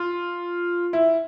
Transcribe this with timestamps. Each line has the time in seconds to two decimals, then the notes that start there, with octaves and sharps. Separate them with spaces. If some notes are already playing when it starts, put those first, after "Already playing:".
Already playing: F4
0.93 E4